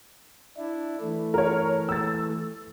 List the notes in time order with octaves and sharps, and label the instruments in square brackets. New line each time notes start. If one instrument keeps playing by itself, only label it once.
[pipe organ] D4 E4
E3 A3
[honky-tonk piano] A#4 C#5
E6 A6